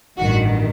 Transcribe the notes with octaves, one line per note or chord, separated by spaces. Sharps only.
A1 G2 D#3 F#4